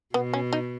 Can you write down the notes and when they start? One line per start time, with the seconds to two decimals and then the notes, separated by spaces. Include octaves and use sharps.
0.14 B2 B3
0.33 C#4
0.53 D#4